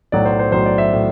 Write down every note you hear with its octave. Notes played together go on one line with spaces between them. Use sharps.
B1 A2 F#3 D5
C5
C5
B1 A2 F#3 C5
D5
E5
A2 F#3